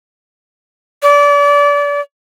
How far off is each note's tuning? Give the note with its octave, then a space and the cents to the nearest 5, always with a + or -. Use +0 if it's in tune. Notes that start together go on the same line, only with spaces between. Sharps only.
D5 -30